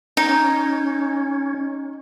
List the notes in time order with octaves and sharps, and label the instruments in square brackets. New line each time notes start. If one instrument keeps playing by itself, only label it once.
[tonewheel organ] C#4 [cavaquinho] D#4